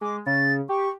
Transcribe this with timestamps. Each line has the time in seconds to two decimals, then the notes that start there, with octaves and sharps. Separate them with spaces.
0.01 G#3 D6
0.26 C#3 A6
0.69 G4 C#6